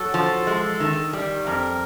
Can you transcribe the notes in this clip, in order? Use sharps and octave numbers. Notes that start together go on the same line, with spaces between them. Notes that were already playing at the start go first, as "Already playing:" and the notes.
Already playing: F#3 A4
F3
G#3
D#3
G3
F2 A#4